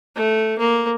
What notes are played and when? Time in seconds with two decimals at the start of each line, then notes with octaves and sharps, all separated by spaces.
0.16 A3
0.59 A#3